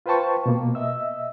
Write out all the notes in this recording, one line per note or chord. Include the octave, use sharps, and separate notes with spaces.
F4 B4 C5 G5 A5 C#6
B2 A#3
D#5 E5 E6